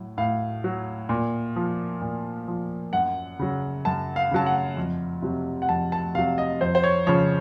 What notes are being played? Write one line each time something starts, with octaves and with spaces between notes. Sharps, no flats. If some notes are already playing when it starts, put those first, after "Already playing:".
Already playing: A2 F#3
A2 F5
F#3
A#2
F3
A#2
F3
F#2 F#5
C#3 F#3
F#2 A5
F5
C#3 F#3 A5
F#5
F2
C3 F#3
F#5
F2 A5
A5
C3 F#3 F5
D#5
F2 C5
C5
C#5
C#3 F3 C#5